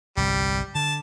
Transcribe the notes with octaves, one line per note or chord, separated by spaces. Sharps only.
G1 C2 G3
D3 A5